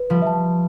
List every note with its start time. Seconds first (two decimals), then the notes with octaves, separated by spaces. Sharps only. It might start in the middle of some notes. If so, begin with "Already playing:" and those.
Already playing: B4
0.10 F3 G3
0.22 E5 A5